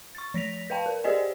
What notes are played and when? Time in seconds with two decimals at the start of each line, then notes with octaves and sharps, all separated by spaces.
0.15 C#6 A6
0.34 F3 A#6 B6 F7
0.70 B4 F5 G5 A5
0.86 A#4
1.04 G4 G#4 C5 D5 D#5 G#5